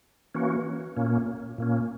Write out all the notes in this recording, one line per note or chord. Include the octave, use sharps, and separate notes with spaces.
E3 A#3 C#4 F#4
A#2 A#3 C#4
A#2 A#3 C#4